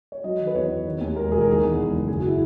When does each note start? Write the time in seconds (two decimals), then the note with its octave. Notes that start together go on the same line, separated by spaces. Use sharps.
0.12 C#5
0.24 F#3 D#5
0.40 D#3
0.47 B4
0.54 E2 C#5
0.70 E2
0.85 D#3
1.01 D#2
1.16 G#3 A#4
1.32 E1 G#4
1.41 A#4
1.47 D#3 G#4
1.63 E2
1.78 G#3
1.93 F#1
2.08 C#3 G#4
2.18 F#4
2.28 E4